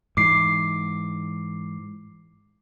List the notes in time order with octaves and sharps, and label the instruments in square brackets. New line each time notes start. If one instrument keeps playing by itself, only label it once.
[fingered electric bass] G#2 E3 [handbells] D6 C7